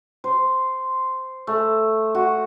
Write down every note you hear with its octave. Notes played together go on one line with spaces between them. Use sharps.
C5
A3
F#4